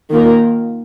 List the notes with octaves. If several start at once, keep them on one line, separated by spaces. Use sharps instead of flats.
D#3 A#3 F4 A#4